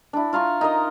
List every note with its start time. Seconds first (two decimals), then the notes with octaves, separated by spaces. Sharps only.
0.13 D4 E4
0.33 F4 F5 A#5 C#6
0.61 D#4 A#4 D#5